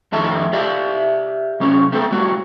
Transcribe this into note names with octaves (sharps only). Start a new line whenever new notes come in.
F2 A2 D#3 A4 E5 A5
G4 D5 E5 F5
C3 F#3 C#4
A3 B3 C4 G#4 A4
A2 G3 F#4